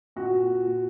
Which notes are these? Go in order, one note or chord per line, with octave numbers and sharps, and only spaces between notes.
A#2 F#4
A#2
A#2
A#2